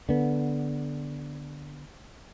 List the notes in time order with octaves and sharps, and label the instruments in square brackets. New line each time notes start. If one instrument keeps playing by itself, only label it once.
[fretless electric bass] D3 B3